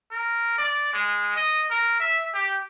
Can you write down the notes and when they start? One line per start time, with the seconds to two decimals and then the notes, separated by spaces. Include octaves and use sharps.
0.11 A#4
0.58 D5
0.93 G#3
1.36 D#5
1.70 A#4
2.00 E5
2.34 G4